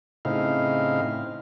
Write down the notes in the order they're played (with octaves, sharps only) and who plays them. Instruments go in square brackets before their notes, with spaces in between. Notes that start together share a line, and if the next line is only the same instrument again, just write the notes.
[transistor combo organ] A2 C#3 C4 D#4 E4 F5